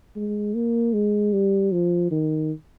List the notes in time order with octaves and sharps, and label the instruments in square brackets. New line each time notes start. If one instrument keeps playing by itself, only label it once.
[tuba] G#3
A#3
G#3
G3
F3
D#3